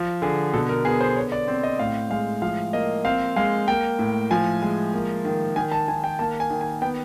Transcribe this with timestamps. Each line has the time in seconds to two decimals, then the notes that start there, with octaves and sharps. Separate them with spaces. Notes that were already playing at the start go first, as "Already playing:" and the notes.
Already playing: F3
0.22 D3 G#4
0.54 B2 A4
0.69 A#4
0.85 B3 G#4
1.01 C5
1.16 D3 C#5
1.32 D5
1.48 C4
1.63 D#5
1.79 A2 F5
2.10 G#3 F5
2.42 F3 F5
2.73 A#3 D#5
3.05 C4 F5
3.36 G#3 F5
3.68 A#3 G5
3.99 A2
4.31 F3 G#5
4.62 G#3
4.94 A#3
5.25 D#3
5.56 D#3 G#5
5.72 A5
5.88 D#3 G#5
6.04 G5
6.19 A#3 A5
6.40 G#5
6.50 D#3
6.61 G#5
6.82 B3 G5